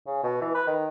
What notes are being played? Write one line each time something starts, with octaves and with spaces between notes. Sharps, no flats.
C#3
B2
E3
B4
D#3